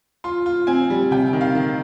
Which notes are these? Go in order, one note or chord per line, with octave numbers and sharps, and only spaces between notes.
F4 C6
F4
C4 G#5
G3
C3 G5
D#3
F5
D#3